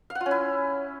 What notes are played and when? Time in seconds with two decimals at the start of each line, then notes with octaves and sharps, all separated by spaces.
0.10 F5
0.15 F#5
0.21 F4
0.26 C#4
0.31 E4